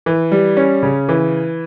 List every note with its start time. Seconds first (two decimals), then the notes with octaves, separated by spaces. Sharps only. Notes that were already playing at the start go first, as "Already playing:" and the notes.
0.06 E3
0.32 G3
0.57 C#4
0.83 C#3
1.09 E3